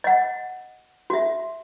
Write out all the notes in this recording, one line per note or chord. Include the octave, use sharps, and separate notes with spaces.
D#5 F#5
F#4 E5